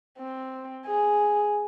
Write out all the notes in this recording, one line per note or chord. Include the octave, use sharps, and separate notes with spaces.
C4
G#4